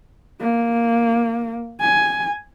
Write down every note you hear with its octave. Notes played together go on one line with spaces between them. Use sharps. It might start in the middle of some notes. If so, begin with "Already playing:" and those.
A#3
G#5